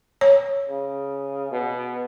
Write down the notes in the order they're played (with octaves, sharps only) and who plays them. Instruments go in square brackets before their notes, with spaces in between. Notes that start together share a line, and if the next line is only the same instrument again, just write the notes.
[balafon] C#5
[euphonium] C#3
B2